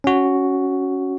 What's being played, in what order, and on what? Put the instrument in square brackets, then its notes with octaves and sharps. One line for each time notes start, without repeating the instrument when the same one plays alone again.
[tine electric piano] C#4 F#4